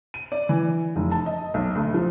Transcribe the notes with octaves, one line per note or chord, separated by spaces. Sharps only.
D#7
D5
E3
F1
A5
D#5
B1
D2
F3